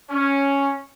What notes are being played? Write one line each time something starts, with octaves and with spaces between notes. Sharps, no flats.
C#4